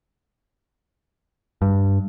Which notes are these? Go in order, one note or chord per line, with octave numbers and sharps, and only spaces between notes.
G2